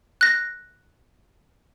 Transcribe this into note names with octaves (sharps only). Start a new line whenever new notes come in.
F#6 A#6